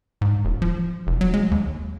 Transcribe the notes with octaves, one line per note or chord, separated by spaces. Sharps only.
G#2
E1
F3
F1
F#3
G#3
D#2